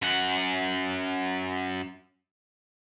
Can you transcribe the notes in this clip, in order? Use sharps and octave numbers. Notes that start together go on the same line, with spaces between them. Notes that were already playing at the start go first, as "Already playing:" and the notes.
F#2 F#5